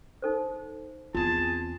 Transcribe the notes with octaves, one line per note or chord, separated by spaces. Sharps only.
D#4 A4 C5
E2 C4 F4 G#4 A5